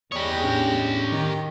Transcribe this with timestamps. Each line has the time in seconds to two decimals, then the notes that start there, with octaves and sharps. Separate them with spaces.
0.12 E2 G#3 G4 C#5 D5 B5 D#6 A#6
0.44 A2 C#4 D4
1.09 D#3 A#5